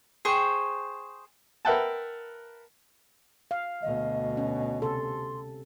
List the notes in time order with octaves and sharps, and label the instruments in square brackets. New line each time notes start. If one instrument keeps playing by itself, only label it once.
[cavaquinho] G#4 C5 G5 C#6
[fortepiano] A#4 B4 E5 F#5 G5 A5
[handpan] F5
[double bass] D2 B2 [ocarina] D#5
[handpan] C#4
[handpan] C3 A4 [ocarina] C6